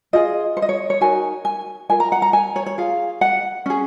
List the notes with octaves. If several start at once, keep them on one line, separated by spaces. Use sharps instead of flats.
F4 G#4 D#5
C5
D#5
C#5
C#5
D#4 F#4 A#4 G#5
G#5
F4 A#4 G#5
A#5
F#5
A#5
G#5
C#5
C#5
F4 G#4 F5
F#5
C#4 G#4